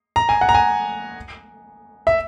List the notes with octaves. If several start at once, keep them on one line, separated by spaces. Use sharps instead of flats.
A#5
G#5
F#5
A#5
G#5
E5